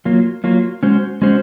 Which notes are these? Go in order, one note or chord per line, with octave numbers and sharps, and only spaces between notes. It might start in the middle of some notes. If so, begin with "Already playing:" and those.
F#3 A#3 F4
F#3 A#3 F4
G#3 C#4 F#4 C5
G#3 C#4 F#4 C5